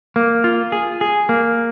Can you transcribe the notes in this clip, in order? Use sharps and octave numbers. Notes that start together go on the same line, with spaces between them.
A#3
F4
G#4
G#4
A#3